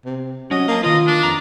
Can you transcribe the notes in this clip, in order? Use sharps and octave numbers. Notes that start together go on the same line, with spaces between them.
C3
F#3 C#4 D#5
A#3 F5 A5
D#3 F4 A#4 B4 D#5
D4
F2 A#5